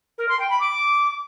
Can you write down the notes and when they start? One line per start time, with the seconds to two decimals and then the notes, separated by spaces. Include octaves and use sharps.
0.18 A#4
0.29 C6
0.39 G5
0.50 B5
0.60 D6